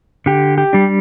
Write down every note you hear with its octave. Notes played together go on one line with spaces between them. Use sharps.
D3 G4
G4
G3 D4